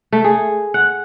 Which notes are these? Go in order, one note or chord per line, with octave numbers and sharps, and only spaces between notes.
A3
G#4
F#5